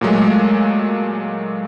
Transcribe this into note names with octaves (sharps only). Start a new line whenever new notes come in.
A#2 F#3 G#3 A3